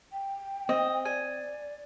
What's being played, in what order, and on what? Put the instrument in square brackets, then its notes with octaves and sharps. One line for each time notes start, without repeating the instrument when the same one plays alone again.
[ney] G5
[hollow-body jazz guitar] C4 [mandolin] D#5
[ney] D5 [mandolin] G#5